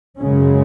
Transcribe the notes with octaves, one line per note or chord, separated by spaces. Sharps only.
F#2 C#3 G#3 C#4